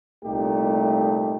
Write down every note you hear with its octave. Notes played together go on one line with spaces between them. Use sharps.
C2 A#2 A3 D#4 G4